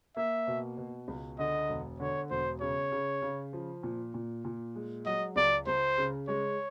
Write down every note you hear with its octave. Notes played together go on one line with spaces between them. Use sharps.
A#3 E5
B2
B2
C#2
D3 D#5
E1
D3 C#5
E1 C5
C#3 C#5
C#3
C#3
F3
A#2
A#2
A#2
G#3
F#3 D#5
C#2 D5
C#2 C5
C#3
G#3 C#5